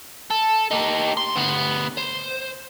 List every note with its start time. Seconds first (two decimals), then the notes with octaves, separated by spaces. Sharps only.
0.31 A4
0.71 D#4 G4
1.17 D2 C6
1.35 D2 B3
1.98 C5